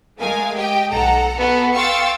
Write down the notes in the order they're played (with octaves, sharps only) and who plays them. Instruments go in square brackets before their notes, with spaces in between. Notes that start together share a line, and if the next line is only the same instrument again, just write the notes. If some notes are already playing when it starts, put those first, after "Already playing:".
[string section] G#3 A3 A#4 F5 G#5
G4 D#5 G5
B1 A4 F#5 A#5
B3 F#4 A4
F5 G5 C6 C#6 E6 A6